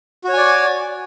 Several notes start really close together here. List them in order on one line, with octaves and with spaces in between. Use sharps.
F#4 C#5 G#5 D5